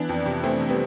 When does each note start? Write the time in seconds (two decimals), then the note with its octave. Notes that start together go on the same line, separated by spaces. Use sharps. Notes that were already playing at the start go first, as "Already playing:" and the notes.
Already playing: E3 B3 D4
0.09 F2
0.26 C3
0.44 E3 A3 C4
0.61 C3
0.70 G3 B3